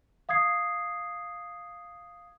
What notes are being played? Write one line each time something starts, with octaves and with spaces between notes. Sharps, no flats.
F5 D#6 G#6 C7